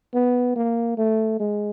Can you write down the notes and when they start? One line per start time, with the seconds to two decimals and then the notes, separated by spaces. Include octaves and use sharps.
0.14 B3
0.56 A#3
0.98 A3
1.40 G#3